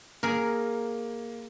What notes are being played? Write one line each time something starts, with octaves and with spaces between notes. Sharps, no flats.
A#3 G#4 A#4